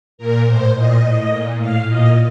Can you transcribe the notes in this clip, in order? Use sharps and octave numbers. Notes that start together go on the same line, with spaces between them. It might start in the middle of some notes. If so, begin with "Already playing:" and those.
A#2 A#4
A2 C5
A#2 D#5
A2
A#2
A2 F5
A#2 D#5